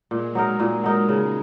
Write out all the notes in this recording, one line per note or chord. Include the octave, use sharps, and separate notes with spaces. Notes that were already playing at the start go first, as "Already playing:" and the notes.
A#2 G#3
F#3 D#4 A#4
A#2
F#3 D#4 A#4
C#3 G#3